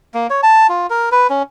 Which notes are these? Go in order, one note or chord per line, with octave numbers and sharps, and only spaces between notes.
A#3
C#5
A5
F4
A#4
B4
C#4